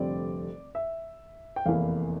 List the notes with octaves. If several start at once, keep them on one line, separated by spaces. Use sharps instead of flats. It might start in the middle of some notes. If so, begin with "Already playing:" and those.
Already playing: F1 F2 D3 G3 C4 D5
E5
G5
F1 E2 E3 A#3 E4 F5